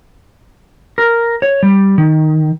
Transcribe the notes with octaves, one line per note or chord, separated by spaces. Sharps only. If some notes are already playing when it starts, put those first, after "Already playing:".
A#4
C#5
G3
D#3